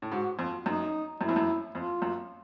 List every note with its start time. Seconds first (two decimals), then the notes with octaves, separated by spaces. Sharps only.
0.02 A2
0.12 G#2 F#4
0.39 F2 F4
0.66 F#2 D#4
1.20 F#2 E4
1.29 F2
1.36 F#2
1.75 F2 F4
2.02 F#2